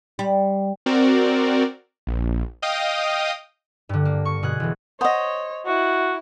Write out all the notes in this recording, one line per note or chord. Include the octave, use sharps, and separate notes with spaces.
G3
C4 F#4 A#4 D5
A#1
D#5 F5 G5 D#6
G2 D3
A#3
C#6
B2 G#4 F#6
E1 E3
C5 C#5 D#5 F#5 C6 D#6
E4 F#4